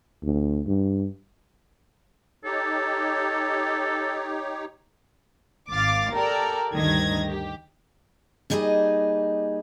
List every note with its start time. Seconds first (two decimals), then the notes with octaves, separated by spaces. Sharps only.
0.23 D2
0.67 G2
2.45 D#4 G4 A4 C#5
5.70 G#1 F5 D6 A6
6.14 G4 A4 A#4 D5
6.75 D2 G2 D#3 G#6 A#6
7.27 G4
8.50 A#2 G3 D#4 G#4 A4 D#5